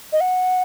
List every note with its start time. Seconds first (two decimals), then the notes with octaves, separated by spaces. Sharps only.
0.12 D#5
0.21 F#5